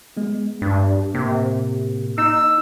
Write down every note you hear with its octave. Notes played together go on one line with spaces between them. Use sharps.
G#3 B3
G2 D4
A2 C3 A#3
D#4 E6